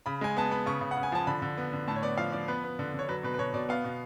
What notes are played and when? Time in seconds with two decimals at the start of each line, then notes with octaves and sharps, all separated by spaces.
0.06 C#3 B5
0.21 G#3 G#5
0.37 B3 A5
0.51 B3 B5
0.66 C#3 C#6
0.81 C#3
0.91 F#5
0.97 C#3
1.03 G#5
1.12 F3 A5
1.27 D3 B5
1.42 D3
1.57 B3
1.73 D3
1.88 A2 A5
1.96 C#5
2.02 B3 D5
2.18 F3 F5
2.32 F3 D5
2.48 B3 B4
2.64 B3
2.79 D3
2.94 D3 C#5
3.08 F#3 B4
3.23 B2 B4
3.34 B4
3.38 B2 C#5
3.54 B2 D5
3.69 B3 F5
3.85 B2